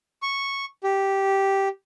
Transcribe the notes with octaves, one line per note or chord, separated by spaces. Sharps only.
C#6
G4